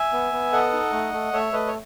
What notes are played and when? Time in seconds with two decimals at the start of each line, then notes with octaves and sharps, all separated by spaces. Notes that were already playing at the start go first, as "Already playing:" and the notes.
Already playing: E5 G#5
0.13 B3
0.33 B3
0.52 A4 D#5 F#5
0.73 D#4
0.92 A3
1.13 A3
1.33 A3 C#5 E5
1.53 A3 B4 D#5
1.67 C#5